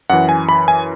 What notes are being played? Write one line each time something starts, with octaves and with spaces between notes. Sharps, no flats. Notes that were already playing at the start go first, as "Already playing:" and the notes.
F#2 E3 F#5
G#5
B5
G#5